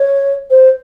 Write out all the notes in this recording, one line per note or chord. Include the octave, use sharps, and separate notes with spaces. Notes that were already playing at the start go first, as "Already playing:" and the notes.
Already playing: C#5
C5